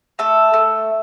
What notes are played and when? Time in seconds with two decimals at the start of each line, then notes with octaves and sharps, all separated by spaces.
0.19 A3 A4
0.54 A3